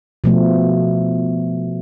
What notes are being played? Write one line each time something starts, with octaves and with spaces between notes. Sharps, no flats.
B2 F3 A3